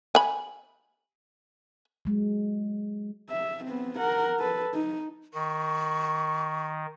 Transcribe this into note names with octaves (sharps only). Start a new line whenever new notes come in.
G#5 B5
F#3 G#3
E5
B3 C4
A#4 F#5
A4 B4
D#4
D#3 C#6